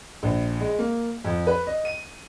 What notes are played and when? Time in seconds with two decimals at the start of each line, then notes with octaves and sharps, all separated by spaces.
0.23 A#1
0.60 G#3
0.79 A#3
1.25 F2
1.47 B4
1.67 D#5
1.85 D#7